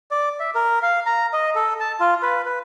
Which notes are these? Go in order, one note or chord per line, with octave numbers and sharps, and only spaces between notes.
D5
E5
A#4
F5
A#5
D#5
A4
A5
F4
B4
B4